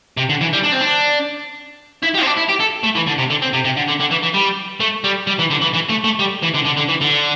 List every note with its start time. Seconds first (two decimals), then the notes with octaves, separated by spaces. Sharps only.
0.17 C3
0.29 D3
0.41 E3
0.53 G3
0.63 D4
0.72 C4
0.81 D4
2.03 E4
2.15 G4
2.22 C4
2.26 D4
2.37 E4
2.49 G4
2.60 A4
2.84 A3
2.95 E3
3.07 D3
3.18 C3
3.30 D3
3.42 C4
3.53 C3
3.65 C3
3.77 D3
3.88 D3
4.00 D3
4.11 E3
4.23 E3
4.34 G3
4.80 A3
5.04 G3
5.27 G3
5.39 E3
5.51 D3
5.62 E3
5.74 E3
5.89 A3
6.04 A3
6.19 G3
6.43 E3
6.55 D3
6.66 D3
6.77 D3
6.89 E3
7.01 D3